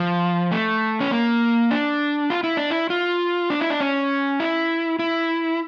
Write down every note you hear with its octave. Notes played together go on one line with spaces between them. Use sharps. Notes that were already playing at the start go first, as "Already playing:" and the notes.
Already playing: F3
A3
C#4
A#3
D4
F4
E4
D4
E4
F4
D4
E4
D4
C#4
E4
E4